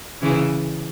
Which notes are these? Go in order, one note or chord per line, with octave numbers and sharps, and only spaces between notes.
C#3 E3